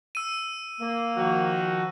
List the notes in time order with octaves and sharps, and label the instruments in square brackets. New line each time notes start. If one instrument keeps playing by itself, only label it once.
[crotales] E6 D#7
[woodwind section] A#3
[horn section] D#3 F3 F#4